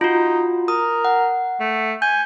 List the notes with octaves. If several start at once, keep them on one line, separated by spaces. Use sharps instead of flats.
D#4 F4 F#4
A#4 D#6
F#5
A3
G#5 G6